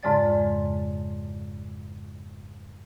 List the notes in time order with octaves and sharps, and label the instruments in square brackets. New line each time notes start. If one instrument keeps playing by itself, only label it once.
[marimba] F2 G#2 C#3 G#3 D5 A6